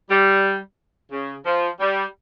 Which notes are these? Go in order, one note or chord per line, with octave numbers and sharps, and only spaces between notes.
G3
C#3
F3
G3